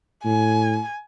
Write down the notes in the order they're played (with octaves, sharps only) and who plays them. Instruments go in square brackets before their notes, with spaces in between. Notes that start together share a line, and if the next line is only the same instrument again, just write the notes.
[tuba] A2 [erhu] G#5